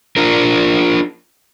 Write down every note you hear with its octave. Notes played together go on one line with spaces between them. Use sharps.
D4 F4 A#4